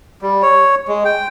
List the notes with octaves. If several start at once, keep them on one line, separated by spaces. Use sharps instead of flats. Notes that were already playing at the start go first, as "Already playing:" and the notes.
G3
C#5
G#3
G5